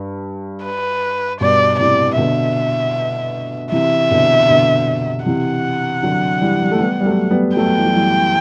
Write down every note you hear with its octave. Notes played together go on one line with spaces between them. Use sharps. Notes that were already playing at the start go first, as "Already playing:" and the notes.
Already playing: G2
B4
G2 B2 D5
A2 C3 D5
B2 D3 E5
C3 E3 E5
B2 D3
B2 D3
C3 E3 F#5
D3 F#3
E3 G3
G3
A3
G3 B3
G3
F#3 A3
G3 B3
F#3 A3 G5
E3
F#3
E3 G3